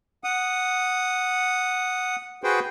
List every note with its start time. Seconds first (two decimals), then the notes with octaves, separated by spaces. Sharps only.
0.24 F#5 D#6
2.44 F#4 G#4 B4 C5 G5